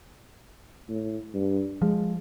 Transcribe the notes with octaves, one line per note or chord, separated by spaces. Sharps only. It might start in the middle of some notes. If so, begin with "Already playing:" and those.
A2
G2
F3 G#3